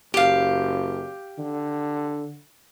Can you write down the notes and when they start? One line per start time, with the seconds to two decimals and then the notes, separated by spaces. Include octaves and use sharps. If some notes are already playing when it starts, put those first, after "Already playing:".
0.14 F#1 G4 F5
1.38 D3